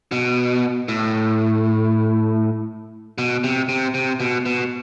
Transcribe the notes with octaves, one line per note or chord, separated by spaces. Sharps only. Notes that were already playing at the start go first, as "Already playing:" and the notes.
B2
A2
B2
C3
C3
C3
B2
B2